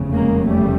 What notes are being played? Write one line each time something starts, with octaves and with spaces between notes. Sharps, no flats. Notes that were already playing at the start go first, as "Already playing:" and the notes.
Already playing: F1 E2 C#3
G#3 A#3
G3 A3